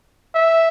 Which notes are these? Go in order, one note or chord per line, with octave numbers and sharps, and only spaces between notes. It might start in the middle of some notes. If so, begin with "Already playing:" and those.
E5